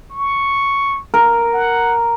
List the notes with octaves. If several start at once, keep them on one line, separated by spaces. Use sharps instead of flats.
C#6
A#4
F#5